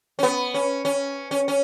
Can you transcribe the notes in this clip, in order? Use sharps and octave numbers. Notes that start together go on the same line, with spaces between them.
C#4
B3
C#4
C#4
C#4
C#4